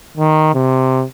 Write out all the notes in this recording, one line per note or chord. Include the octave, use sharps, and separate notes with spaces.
D#3
C3